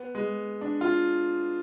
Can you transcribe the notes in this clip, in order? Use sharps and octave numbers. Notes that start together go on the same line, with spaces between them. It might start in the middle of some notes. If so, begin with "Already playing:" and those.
Already playing: B3
G#3
D4
F4